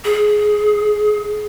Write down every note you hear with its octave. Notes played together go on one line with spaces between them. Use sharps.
G#4